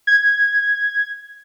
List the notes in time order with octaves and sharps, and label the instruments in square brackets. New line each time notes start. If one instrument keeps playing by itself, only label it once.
[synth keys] G#6